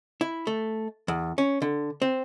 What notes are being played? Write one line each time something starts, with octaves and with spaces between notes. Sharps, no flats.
E4
A3
E2
C#4
D3
C4